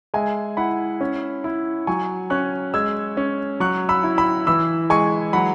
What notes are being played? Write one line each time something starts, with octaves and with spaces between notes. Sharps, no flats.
G#3 E5 G#5
E4 F#5 B5
C#4
E4
F#3 G#5 C#6
C#4 C#6 F#6
G#3 E6 G#6
C#4
F#3 C#6 F#6
B5 E6
E4
B5 E6
E3 B5 E6
G#3 G#5 C#6
F#3 F#5 B5